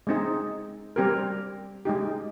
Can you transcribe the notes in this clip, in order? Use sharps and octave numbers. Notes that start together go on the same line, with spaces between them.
G#3 C4 D#4 G#4
G3 C4 G4 A#4
G#3 D#4 G4